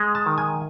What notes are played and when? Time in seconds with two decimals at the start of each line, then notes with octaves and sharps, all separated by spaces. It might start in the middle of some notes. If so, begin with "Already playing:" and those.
Already playing: G#3
0.15 A5
0.26 D#3
0.38 G#5